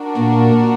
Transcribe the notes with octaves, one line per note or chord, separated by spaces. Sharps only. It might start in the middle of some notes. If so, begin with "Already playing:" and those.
Already playing: D4 F#4 A#4
A#2 A#3